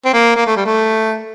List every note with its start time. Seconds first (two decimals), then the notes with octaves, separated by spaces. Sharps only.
0.05 C4
0.13 A#3
0.36 A#3
0.46 A3
0.57 G3
0.66 A3